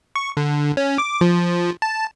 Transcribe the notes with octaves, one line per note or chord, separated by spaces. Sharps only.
C#6
D3
C#4
D6
F3
A5